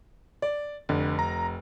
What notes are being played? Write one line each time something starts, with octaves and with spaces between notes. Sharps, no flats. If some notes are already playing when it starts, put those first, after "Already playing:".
D5
F1 D3
A#5